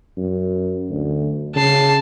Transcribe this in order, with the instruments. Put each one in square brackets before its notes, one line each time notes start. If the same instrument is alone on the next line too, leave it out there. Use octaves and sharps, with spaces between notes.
[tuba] F#2
D2
[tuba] C#3 [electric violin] A5 C7